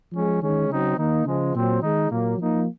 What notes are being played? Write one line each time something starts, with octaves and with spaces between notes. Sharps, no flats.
F3 G#3 C#4
D#3 G#3 C#4
C#3 F#3 C4 D#4
D#3 A#3 D#4
C#3 F3 G#3
A#2 F#3 C4
D#3 G#3 D#4
A#2 F#3 A#3
F3 A#3 D#4